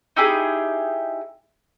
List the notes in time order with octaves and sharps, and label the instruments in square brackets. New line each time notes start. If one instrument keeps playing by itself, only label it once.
[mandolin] D#4 E4 G4 G#4